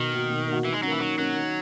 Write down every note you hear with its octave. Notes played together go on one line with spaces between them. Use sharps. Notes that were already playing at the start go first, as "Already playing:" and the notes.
Already playing: B2 D#3
A#3 D#4 F#4
B2
A#3 D#4 F#4
D#3 E3
G#3
E3 F#3 A#3 C#4
D#3 F#3
F#3 A#3 C#4
D#3